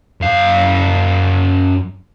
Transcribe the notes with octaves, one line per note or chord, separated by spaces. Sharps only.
F#2 F5